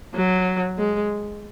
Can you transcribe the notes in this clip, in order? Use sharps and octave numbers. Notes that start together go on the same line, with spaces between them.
F#3
G#3